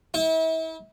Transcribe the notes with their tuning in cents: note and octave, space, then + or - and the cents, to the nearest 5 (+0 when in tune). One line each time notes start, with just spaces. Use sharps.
E4 -40